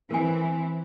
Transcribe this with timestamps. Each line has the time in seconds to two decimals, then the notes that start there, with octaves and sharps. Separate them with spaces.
0.11 E3 C4 A#4 G#5